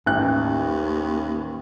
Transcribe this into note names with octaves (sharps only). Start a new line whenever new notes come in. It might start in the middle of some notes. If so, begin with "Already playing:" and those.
A1 D#2 F#6